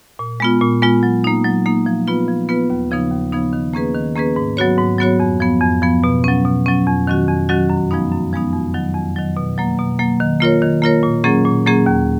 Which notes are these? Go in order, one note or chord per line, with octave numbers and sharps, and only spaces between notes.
A#2
G#3 B3 F4
A#2
G#3 B3 F4
F#3
A#3 D#4
F#3
A#3 D#4
F3
B3 F4 B4
F3
B3 F4 B4
D#2
C#3 F3 B3 D#4
D#2
C#3 F3 B3 D#4
D#3
A#3 C#4 G#4 B4
D#3
A#3 C#4 G#4 B4
G#2
F#3 B3 F#4 C#5
G#2
F#3 B3 F#4 C#5
F2
F3 B3
F2
F3 B3
B2
F#3 C#4
B2
F#3 C#4
F2
D#3 F#3 C#4 F#4
F2
D#3 F#3 C#4 F#4
F#2
F3 G#3 B3 D#4
F#2
F3 G#3 B3 D#4
F2
D#3 F#3
F2
D#3 F#3
B2
F#3 A#3
B2
F#3 A#3
D#3
A#3 F4 A#4 C#5
D#3
A#3 F4 A#4 C#5
A#2
F#3 A#3 C#4 G#4
A#2
F#3 A#3 C#4 G#4
D#2